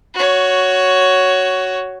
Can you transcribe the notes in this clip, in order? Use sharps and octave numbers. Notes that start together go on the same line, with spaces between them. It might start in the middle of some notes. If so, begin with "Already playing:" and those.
F#4 C#5